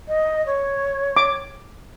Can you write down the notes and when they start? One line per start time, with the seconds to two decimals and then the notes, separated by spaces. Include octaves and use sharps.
0.08 D#5
0.46 C#5
1.17 D6